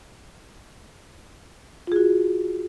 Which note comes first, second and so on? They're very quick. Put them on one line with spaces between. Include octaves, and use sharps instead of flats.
F4 G#4 F#4